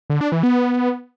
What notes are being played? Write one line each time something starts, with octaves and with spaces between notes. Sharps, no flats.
D3
D4
E3
B3